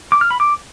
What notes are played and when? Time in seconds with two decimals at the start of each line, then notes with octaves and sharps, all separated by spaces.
0.12 D6
0.21 F6
0.31 B5
0.40 D6